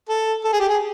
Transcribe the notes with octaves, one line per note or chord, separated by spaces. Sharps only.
A4
A4
G#4
G4
G#4